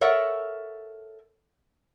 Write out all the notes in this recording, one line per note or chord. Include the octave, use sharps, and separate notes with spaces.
A4 A#4 C#5 E5 F#5